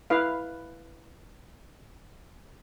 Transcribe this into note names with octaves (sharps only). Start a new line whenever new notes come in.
E4 B4 F5